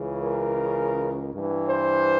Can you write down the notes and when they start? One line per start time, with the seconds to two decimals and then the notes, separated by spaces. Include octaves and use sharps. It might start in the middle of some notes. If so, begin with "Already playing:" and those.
Already playing: C#2 C#3 E3
0.22 A#4
1.32 G2 E3
1.69 C5